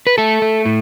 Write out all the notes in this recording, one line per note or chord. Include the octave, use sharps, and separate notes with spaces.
B4
A3 A4
A3
A2